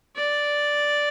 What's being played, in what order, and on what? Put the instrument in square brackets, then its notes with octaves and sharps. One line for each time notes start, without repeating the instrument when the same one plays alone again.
[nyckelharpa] D5